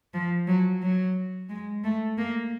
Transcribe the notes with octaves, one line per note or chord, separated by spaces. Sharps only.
F3
F#3
F#3
G#3
A3
A#3